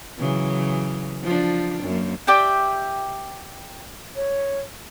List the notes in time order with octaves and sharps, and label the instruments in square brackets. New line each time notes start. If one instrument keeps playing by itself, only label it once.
[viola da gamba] C#3 E3 F#3
F3 D4
F#2 A#3
[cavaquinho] G4 D5 E5 G5
[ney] C#5